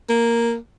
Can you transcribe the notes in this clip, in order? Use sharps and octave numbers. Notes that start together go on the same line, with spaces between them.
A#3